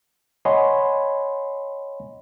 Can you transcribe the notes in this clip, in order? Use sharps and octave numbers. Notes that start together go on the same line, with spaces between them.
C#5 D#5 F#5 G#5 B5 C6